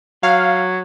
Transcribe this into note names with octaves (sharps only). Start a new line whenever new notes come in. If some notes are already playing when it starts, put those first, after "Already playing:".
F#3 F5